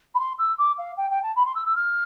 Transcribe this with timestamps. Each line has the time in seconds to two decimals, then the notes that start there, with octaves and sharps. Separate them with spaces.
0.14 B5
0.19 C6
0.38 E6
0.58 D6
0.78 F5
0.97 G5
1.10 G5
1.22 A5
1.36 B5
1.45 C6
1.55 E6
1.66 E6
1.75 F6